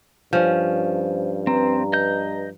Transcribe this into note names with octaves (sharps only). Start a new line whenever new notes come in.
G2 F3 C#4 C5
C4 B4 A#5
D#5 G6